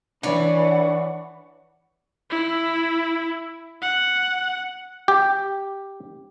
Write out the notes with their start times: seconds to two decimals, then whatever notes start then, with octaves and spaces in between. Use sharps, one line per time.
0.23 E3 D4 C#5 D5 F#5 B5 C#6
2.30 E4
3.82 F#5
5.08 G4